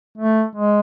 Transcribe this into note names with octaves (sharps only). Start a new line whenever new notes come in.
A3
G#3